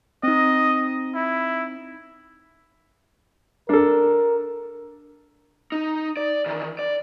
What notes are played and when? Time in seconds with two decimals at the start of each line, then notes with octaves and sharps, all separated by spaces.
0.23 C4 D#4 D#5
1.15 E4
3.69 D4 A4 A#4
5.72 D#4
6.17 D5
6.46 D#3 E3
6.79 D5